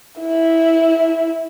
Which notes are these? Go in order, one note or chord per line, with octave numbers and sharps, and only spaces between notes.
E4